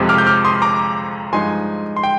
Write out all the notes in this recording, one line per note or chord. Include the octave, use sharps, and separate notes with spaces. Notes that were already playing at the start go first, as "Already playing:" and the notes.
Already playing: F2 C3 F3 G#3
D6 F6
G6
D6 F6
C6 D#6
A#5 D6
G2 F3 G#3 D#4 G#5 C6
C6
G5